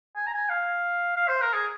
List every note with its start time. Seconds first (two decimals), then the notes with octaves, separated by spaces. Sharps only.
0.16 G#5
0.27 A#5
0.33 G#5
0.49 F5
1.16 F5
1.28 C5
1.42 A#4
1.54 G#4